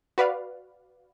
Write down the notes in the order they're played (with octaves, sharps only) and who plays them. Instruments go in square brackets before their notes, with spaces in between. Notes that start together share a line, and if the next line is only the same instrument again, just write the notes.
[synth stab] F#4 B4 D5 F5